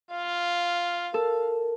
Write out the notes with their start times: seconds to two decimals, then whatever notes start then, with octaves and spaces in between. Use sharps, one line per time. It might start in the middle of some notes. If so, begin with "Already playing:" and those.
0.11 F4 F5
1.14 A4 A#4